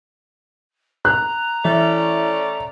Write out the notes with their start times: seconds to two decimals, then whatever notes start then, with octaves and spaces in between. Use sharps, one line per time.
1.05 A#5 F#6
1.65 E3 A3 C#4 D5